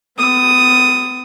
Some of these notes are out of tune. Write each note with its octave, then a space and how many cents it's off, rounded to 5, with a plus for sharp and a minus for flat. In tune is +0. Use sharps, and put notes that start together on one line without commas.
B3 +40 D#6 +0